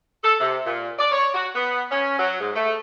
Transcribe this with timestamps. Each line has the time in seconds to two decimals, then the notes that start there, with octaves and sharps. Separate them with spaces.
0.24 A4
0.40 C3
0.66 A#2
0.99 D5
1.12 C#5
1.34 F#4
1.55 B3
1.91 C#4
2.18 F#3
2.40 G#2
2.55 A3